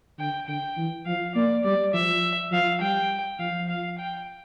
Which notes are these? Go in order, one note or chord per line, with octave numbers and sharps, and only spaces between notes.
D3 G5
D3 G5
E3
F3 F5
A#3 D5
G3 D5
F3 E5
F3 F5
G3 G5
F3 F5
F5
G5